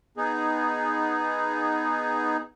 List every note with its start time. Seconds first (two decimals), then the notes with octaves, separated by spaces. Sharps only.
0.17 B3 D#4 G#4